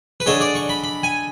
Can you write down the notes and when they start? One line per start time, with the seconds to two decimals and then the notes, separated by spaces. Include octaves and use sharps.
0.20 B4
0.26 D3 G#3 C#5
0.41 D5
0.55 C#6
0.69 B5
0.84 B5
1.03 G#5